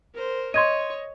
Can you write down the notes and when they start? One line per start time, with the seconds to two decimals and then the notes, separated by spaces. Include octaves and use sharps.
0.15 A#4 C5
0.54 C#5 D#5 C6 C#6 G#6 D#7